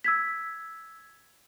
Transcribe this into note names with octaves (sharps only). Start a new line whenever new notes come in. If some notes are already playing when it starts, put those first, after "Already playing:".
E6 G#6 B6